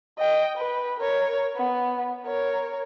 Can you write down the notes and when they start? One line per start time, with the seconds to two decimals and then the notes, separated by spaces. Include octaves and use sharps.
0.19 D#5 G5
0.57 B4
1.00 A#4 C#5
1.56 B3
2.26 A#4 C#5